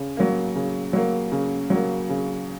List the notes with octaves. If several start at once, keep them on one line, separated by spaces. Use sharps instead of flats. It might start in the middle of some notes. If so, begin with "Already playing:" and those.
Already playing: C#3
F#3 A#3
C#3
F#3 A#3
C#3
F#3 A#3
C#3